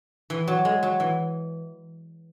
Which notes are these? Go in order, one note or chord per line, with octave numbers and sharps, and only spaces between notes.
E3
F#3
G#3
F#3
E3